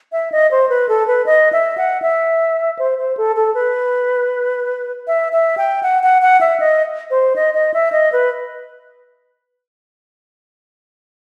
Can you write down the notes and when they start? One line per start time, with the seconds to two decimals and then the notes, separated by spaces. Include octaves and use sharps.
0.12 E5
0.32 D#5
0.51 C5
0.69 B4
0.89 A4
1.08 B4
1.26 D#5
1.53 E5
1.78 F#5
2.02 E5
2.79 C5
2.98 C5
3.17 A4
3.36 A4
3.55 B4
5.07 E5
5.33 E5
5.58 G5
5.83 F#5
6.03 F#5
6.22 F#5
6.41 E5
6.60 D#5
7.11 C5
7.36 D#5
7.54 D#5
7.74 E5
7.92 D#5
8.13 B4